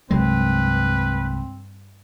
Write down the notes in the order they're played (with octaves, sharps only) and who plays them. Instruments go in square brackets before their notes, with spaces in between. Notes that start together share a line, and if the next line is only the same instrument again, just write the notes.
[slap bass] C2 F#3 G#3 [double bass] G2 [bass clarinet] C4 [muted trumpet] B4